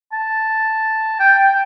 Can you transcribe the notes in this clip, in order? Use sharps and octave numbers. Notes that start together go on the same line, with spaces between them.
A5
G5
G5